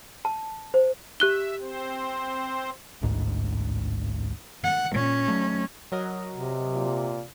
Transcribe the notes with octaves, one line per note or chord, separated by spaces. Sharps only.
A5
C5
G4 E5 F#6 G7
C4 C5
A1 D2 G#2
F#5
A#2 C#4
F#3 A3
F#3 A#4 D#5
C3
A#2